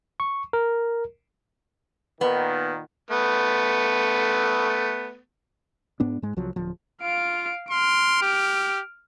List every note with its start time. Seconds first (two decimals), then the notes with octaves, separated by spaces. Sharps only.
0.20 C#6
0.53 A#4
2.21 A#2 D#3 B3
3.11 A3 B3
6.00 G#2 B3 D4
6.22 G#2 G#3
6.36 C2 F3 F#3
6.56 D1 F3
7.02 F4 F5 D7
7.70 C6 F6 D7
8.22 G4